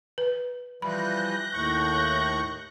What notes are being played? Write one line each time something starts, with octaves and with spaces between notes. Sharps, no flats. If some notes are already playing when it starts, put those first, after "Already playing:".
B4
E3 F3 G3 B5 F#6 G6 A#6
D#2 A2 C#6